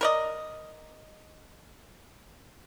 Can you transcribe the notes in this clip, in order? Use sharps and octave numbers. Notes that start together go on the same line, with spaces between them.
A#4 D5 D#5